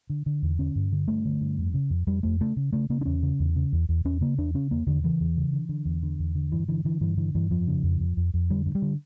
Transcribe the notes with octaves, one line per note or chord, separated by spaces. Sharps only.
D3
D3
E2
D3 C#4
G2
D3
G2 A3
D3
G2
F2
C#3
F2
F2 G3
F2 A3
C#3 A3
C#3
C#3 A3
C#3 A#3
D4
E2 C#4
C#3
E2
C#3
E2
E2
E2 C#4
C#3 A#3
E2 D4
C#3 C#4
E2 A#3
E2 D3
C#3 E3
E2
C#3
D3
D3
E2
D3
E2
D3
G2 E3
D3 E3
D3 E3
G2 E3
D3 E3
G2 E3
F2 F3
C#3
F2
F2
F2
F2
D3 G3
G2
G3
D3